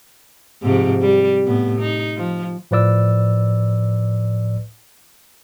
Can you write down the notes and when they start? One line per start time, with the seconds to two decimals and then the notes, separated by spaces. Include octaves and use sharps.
0.62 G#2 C3 F3
1.02 G3
1.46 A2 B3
1.80 D#4
2.17 F3
2.71 A2 F3 B4 D5 E6